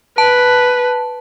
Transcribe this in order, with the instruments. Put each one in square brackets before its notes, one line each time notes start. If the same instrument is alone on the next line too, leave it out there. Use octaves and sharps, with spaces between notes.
[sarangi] B4 [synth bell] A5